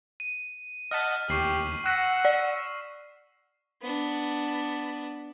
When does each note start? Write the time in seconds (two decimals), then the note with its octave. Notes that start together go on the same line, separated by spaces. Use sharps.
0.20 D#7
0.91 D#5 F#5 A5 F6 B6
1.29 D#2 G4 C#6 C7 F#7
1.86 F#5 C#6 E6 F#6 A#6 B6
2.25 D5
3.82 B3 D4